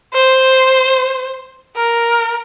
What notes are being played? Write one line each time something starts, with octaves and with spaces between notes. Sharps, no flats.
C5
A#4